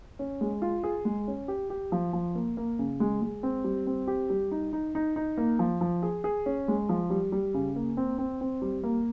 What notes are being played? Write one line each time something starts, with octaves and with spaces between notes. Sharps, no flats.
C#4
G#3
F4
G#4
G#3
C#4
G4
G4
F3
F3
A#3
A#3
C#3
G#3
G#3
C4
G3
C4
G4
G3
D#4
D#4
D#4
D#4
A#3
F3
F3
G#4
G#4
C#4
G#3
F3
G3
G3
C#3
A#3
C4
C4
C4
G3
A#3